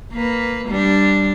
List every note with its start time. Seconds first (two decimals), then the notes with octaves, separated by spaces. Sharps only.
0.13 A#3 B4
0.69 G3 D4